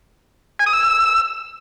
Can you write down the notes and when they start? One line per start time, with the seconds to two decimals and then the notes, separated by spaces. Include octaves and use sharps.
0.59 G#5
0.66 D#6
0.73 E6